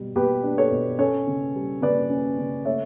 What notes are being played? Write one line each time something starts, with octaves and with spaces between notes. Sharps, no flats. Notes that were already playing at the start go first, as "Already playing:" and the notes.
Already playing: B2 G3
B2 G4 B4
D4
A4 C#5
B2
C#4 A4 C#5
C#3
G3
C#3 B4 D5
C#4
C#3
A3 C#5 E5